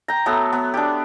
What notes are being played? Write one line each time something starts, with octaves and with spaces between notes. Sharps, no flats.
G5 A#5
F#3 A3 B3
B3
D4 G4